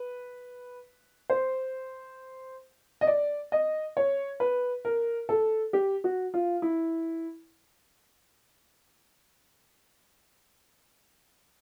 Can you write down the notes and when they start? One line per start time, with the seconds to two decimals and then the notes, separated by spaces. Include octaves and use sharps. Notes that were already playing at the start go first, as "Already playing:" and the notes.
Already playing: B4
1.30 C5
3.01 D#5
3.07 D5
3.52 D#5
3.97 C#5
4.40 B4
4.85 A#4
5.29 A4
5.73 G4
6.04 F#4
6.34 F4
6.62 E4